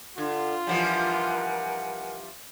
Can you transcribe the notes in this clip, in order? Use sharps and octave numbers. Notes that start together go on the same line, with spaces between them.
D3 F4
E3 F3 G3 A#4 F#5 G#5